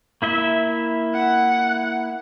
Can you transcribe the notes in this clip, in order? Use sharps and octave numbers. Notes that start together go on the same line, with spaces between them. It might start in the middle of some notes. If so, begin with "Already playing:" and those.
A#3 E4 E5
F#5